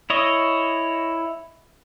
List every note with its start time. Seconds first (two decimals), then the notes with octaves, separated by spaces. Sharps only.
0.10 E4 C#5 D#5